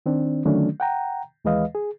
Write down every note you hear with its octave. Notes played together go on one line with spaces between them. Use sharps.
D#3 C4 D4
D3 D#3 F#3 A3 C#4 D4
F#5 G5 A#5
D#2 E3 G#3 B4 D#5 F5
G#4